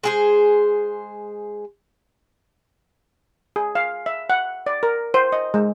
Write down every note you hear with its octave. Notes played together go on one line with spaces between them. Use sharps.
G#3 G#4 C5
G#4
F5
E5
F#5
D5
A#4
C5
D#5
G#3